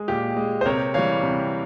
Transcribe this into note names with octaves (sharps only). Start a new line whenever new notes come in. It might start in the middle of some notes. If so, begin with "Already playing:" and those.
Already playing: G#3 G#4
A#2 G4
G#3
C5
C3 A#4 C#5
E3 G3 C#5 F5
C3